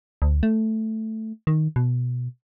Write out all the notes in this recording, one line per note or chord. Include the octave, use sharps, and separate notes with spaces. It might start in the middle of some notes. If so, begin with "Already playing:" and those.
D2
A3
D#3
B2